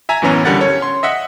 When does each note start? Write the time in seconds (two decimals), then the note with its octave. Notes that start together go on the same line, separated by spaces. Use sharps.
0.09 E5 G#5 A#5
0.22 A1 F#2 E3 B3 C#4 A#5
0.45 C#2 D3 G3 A#4 F#5 A6
0.60 C#4 C#5
0.82 C6
1.03 D#5 E5 F#5 B6